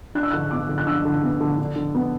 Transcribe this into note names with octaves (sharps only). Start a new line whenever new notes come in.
D4 F#6
E6
D3 F#6
B3 D6
D3
F#6
D4 E6
D3
B3
D3
D4
D3
B3